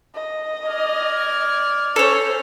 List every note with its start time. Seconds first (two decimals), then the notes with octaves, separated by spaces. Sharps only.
0.15 D#5
0.67 D5 F6 G#6
1.96 C#4 A4 C5 C#5